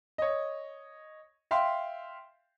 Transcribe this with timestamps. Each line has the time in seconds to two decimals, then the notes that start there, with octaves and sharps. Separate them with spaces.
0.18 C#5 D#5
1.51 E5 F5 G5 C6